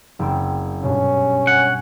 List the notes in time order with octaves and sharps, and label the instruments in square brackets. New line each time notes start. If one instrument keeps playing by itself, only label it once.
[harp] F#1 C4
[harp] G2 B2 [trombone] C#4
[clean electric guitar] F#5 [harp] G#5